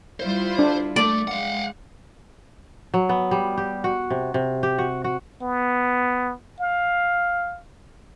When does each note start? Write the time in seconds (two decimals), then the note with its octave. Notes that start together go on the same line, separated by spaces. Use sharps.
0.20 G3 E4 F4 C5
0.59 D4
0.96 A3 D5
1.28 G#3 F5 F#5
2.94 F#3
3.09 B3
3.31 G3
3.58 G4
3.84 F#4
4.10 C3
4.34 C3
4.63 G4
4.78 F#4
5.04 F#4
5.42 B3
6.60 F5